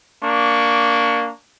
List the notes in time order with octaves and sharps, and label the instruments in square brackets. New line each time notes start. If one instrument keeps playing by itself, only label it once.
[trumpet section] A#3 D4 C#6